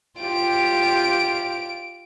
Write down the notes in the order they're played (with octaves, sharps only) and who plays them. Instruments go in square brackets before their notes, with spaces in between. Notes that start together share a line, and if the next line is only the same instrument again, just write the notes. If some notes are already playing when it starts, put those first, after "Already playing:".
[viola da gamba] F4 G4 [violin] D7